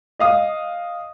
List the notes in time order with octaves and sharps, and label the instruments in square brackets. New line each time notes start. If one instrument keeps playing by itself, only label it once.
[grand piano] D#5 F5 D#6